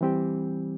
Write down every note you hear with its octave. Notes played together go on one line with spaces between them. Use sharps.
E3 G3 C4 G4